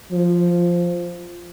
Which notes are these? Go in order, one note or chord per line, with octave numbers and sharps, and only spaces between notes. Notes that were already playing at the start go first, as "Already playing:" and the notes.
F3